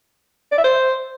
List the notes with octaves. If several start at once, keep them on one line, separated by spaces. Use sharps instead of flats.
D5
E5
C5